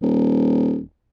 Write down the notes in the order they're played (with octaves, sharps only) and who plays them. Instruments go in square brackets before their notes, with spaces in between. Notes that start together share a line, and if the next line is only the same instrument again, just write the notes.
[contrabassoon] D#1